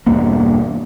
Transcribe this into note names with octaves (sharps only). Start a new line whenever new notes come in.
E1 E2 G2 A#3